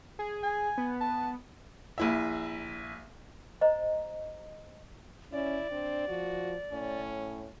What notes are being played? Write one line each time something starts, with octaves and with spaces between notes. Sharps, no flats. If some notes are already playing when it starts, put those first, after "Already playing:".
G#4
G#5
B3
A5
A#1 E4 E5
C5 D#5 A#5
C#4 E4 D5
C4 D4
F3 F#4
A2 C#4